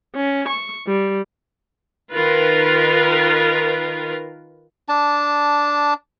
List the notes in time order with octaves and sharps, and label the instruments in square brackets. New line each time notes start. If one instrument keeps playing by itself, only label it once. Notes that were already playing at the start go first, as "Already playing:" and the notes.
[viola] C#4
C#6
G3
[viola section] D#3 F4 A#4 B4
[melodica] D4 A5